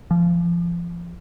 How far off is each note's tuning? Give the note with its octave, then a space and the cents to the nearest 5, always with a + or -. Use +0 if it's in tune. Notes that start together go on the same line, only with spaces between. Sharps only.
F3 -25